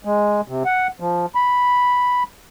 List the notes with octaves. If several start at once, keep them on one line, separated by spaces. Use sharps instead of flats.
G#3
C3
F#5
F3
B5